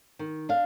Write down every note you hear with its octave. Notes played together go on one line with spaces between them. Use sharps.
D#3
D4 F5